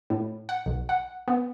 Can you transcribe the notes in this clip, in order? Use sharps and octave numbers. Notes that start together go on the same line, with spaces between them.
A2
F#5
B1
F#5
B3